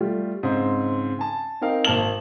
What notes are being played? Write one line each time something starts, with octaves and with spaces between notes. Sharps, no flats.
G3 A3 F4 G4
G#2 C#3 C4
G#5 A5
C4 D#4 A#4 F5 G5
G#1 A#3 A5 F6 E7 F#7